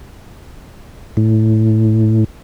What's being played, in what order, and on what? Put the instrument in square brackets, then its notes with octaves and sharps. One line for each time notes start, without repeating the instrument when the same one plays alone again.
[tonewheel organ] A2